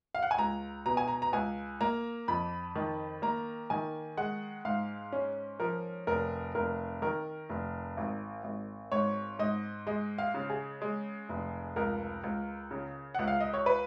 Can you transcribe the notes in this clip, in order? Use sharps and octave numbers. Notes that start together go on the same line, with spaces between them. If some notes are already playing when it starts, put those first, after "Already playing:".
F5
F#5
G#5
C#2 A#5
B2 A#5
G#5
A#5
A#5
C#2 G#5
A#3 A#5
F2 B5
D#3
A#3 A#5
D#3 G#5
G#3 F#5
G#2 F5
C#4
F3 A#4
F1 A#4
F1 A#4
D#3 A#4
F1
G#1
G#1
G#2 C#5
G#2 D#5
G#3 D#5
F5
C#3
G#4
G#3
F1
C#2 A#4
C#2
C#3
C#2 F#5
F5
D#5
C#5
B4